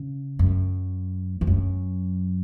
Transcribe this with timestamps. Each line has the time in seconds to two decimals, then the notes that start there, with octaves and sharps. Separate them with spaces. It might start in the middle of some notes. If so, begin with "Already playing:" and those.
Already playing: C#3
0.39 F#2
1.41 E2
1.47 F#2